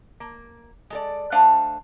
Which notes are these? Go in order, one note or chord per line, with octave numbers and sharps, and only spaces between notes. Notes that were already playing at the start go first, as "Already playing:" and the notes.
A#3
G#3 A4 D5
A3 D4 C5 F5 F#5